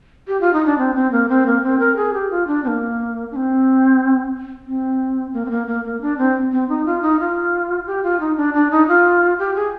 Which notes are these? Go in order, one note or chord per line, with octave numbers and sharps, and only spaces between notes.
G4
F4
D#4
D4
C4
C4
A#3
C4
A#3
C4
A#4
G#4
G4
F4
D4
C4
A#3
D4
C4
C4
A#3
C4
A#3
A#3
A#3
D4
C4
C4
D#4
F4
D#4
F4
G4
F4
D#4
D4
D4
D#4
F4
G4
G#4